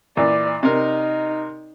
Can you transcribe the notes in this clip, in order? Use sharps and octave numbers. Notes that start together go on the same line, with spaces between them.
A#2 E3 D5
C3 D#4 A#4